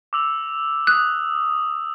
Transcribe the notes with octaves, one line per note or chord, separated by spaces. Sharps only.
D6 E6 F7
D#6 F#6